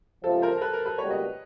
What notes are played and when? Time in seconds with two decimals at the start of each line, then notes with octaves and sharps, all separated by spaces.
0.23 C#2 C3 F3 A4
0.42 A#4 C5
0.57 A#4
0.61 A4 B4
0.73 A#4
0.86 A4 B4
0.98 C#2 B2 G3 A#3 B4 C#5
1.11 C#5 D#5